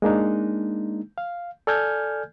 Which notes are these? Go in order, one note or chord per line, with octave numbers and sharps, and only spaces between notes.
G#3 A#3 D4 D#4
F5
A4 D5 G#5 F6 G6 G#6